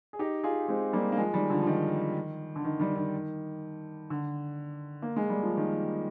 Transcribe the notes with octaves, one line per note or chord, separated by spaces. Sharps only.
G#4
D#4 G4
F4 G#4
G#3 C4
G3 A#3
A#3
F3 G#3
D#3 G3
D3 F3
F3
D#3
D3
D#3
D#3 G3
D#3
D3
A#3
G#3
G3
F3
D#3